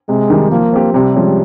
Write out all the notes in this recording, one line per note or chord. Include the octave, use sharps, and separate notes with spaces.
C3 G#3
D#3 G3
F3 A#3
C4 G4
C3 G3
F3 G#3 C#4